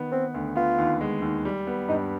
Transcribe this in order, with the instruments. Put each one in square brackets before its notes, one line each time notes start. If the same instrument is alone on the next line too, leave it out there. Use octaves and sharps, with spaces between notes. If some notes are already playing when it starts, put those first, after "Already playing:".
Already playing: [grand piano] D#3 B3
[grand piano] B3 [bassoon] C4
[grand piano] D2
[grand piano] B3 [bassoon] F4
[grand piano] D#2
G#3
D#2
G3
B3
[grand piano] G2 [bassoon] D#4